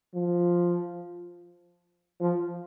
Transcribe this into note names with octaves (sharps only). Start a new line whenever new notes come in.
F3
F3